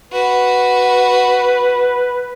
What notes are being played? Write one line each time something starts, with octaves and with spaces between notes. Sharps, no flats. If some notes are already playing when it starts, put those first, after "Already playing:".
F#4 B4